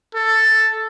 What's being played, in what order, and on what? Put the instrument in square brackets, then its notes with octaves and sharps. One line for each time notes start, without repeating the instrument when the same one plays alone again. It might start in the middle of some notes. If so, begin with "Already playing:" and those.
[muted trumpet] A4